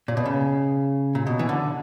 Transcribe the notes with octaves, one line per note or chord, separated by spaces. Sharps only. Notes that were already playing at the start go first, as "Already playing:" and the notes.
A#2
B2
C#3
A#2
B2
E3
D3